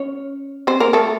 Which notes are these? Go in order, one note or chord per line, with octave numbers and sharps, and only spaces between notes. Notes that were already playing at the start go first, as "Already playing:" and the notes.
Already playing: C#4 C#5
C4 C5
A#3 A#4
A3 A4